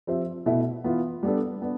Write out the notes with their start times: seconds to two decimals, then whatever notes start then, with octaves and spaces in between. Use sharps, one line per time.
0.07 F3 C4 G4 C5 E5
0.46 B2 A3 E4 A4 E5
0.84 E3 B3 F4
1.23 G3 B3 D4 A4
1.62 B3 D4